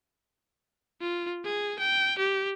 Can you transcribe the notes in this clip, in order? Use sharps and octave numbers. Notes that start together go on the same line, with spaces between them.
F4
G#4
G5
G4